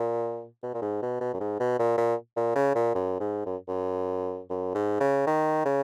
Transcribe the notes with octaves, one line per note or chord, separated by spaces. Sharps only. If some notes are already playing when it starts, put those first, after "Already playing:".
Already playing: A#2
B2
A#2
G#2
B2
B2
F#2
G#2
B2
A#2
A#2
A#2
C#3
A#2
F#2
G#2
F#2
F#2
F#2
G#2
C#3
D#3
C#3